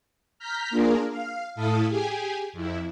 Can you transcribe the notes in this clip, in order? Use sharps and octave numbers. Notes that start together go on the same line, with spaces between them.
A#5 F6 G6 B6
A#3 D4 F4 G#4 A#4
F5
A2 E4 A4 F5 A5 D#6
G4 G#4 G#5
F2 E4